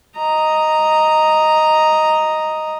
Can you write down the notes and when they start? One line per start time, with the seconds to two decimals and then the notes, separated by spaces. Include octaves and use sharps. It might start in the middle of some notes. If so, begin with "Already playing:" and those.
0.17 D#5 A#5